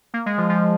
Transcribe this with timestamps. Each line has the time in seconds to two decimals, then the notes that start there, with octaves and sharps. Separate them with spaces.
0.14 A#3
0.26 G#3
0.38 F3
0.50 F3